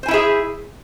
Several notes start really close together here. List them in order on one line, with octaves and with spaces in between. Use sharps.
C5 G#5 E4 E5 G#4